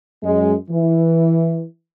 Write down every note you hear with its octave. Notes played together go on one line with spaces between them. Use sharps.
F#2 G#3
E3